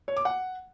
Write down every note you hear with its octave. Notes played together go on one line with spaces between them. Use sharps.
C#5
D6
F#5